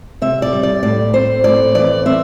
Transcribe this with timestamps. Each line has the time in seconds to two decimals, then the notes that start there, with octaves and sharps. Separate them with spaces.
0.22 C3 E5
0.42 D5
0.53 G3
0.63 D5
0.83 A2 D5
1.13 C4 C5
1.44 A2 D5
1.75 E3 D5
2.05 C4 E5